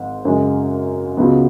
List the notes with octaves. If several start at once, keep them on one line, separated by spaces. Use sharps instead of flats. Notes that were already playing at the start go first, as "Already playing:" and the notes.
Already playing: G#1 G#2
F#2 C#3 G#3
C#2 C#3 F#3 B3